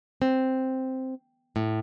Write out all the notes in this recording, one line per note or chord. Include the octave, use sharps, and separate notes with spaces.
C4
A2